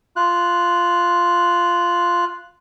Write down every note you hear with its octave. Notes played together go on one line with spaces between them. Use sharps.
F4 F#6